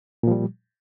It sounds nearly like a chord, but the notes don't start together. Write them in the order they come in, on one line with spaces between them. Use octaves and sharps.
A#2 F3 G3